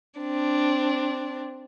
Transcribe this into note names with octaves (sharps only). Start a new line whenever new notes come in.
C4 D4